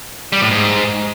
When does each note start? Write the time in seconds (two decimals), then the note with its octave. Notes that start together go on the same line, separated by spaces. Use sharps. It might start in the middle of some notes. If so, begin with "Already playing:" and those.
0.33 G3
0.42 A2
0.51 G#2